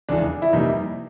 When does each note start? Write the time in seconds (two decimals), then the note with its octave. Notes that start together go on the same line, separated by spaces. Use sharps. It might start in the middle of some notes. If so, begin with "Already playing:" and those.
0.09 F1 E2 C#3 E3 G#3 D4
0.42 E4
0.53 F2 C3 E3 G3 A#3 D#4